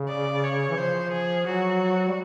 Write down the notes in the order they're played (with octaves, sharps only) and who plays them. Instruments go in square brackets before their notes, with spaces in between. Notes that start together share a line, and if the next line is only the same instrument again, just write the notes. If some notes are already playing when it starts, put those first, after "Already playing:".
Already playing: [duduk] C#3
[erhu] D5
C#5
[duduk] E3
[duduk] F3 [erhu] C5
[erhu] G#4
[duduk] F#3 [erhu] F#4
[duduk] G3